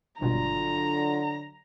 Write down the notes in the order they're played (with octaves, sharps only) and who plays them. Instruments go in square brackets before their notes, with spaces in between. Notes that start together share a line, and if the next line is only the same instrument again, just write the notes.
[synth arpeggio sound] G#1 G2 B2 [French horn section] D3 F#3 [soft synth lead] F4 [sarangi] A#5